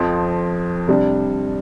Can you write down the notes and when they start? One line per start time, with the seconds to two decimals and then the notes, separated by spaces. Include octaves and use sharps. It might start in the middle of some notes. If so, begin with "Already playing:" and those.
Already playing: F2 F3 C4
0.88 C3 G3 D4